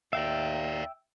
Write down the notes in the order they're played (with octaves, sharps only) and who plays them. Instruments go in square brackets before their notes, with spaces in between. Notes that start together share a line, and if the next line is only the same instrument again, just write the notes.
[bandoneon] D#2 [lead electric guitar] D5 F5 [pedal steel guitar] E5 G5